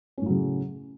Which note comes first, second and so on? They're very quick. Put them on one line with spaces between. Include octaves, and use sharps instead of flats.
C#4 A2 F#3 C#3